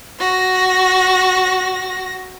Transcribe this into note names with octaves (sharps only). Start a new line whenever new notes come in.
F#4 A#6